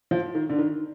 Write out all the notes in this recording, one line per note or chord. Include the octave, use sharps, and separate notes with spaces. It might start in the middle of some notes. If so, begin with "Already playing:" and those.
F3
D#3
D3
D#3